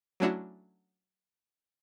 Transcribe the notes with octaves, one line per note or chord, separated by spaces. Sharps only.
F#3 A3 C#4 D4 E4 F#4